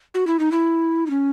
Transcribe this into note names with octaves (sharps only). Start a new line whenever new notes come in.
F#4
E4
D#4
E4
D#4
C#4